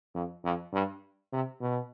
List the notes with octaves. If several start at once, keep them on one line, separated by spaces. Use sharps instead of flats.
F2
F2
G2
C3
B2